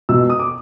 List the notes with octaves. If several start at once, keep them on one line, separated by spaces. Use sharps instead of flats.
B2 E6
D#6
D6